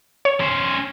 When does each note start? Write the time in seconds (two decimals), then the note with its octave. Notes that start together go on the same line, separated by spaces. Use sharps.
0.25 C#5
0.40 C#4 C5